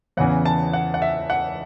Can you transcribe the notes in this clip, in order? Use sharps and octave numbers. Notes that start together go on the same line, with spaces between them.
E2 C#3 E3 F#5
A5
F#5
F#5
E5
F#5